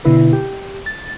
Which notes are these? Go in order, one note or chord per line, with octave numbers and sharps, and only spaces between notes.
B2 D3 E4 B4
G4
A6